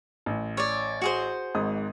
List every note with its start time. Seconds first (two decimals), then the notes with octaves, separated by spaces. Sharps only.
0.26 A1
0.57 C#5 D5
1.02 F#4 G#4 C5
1.55 G#1 G#2 D#6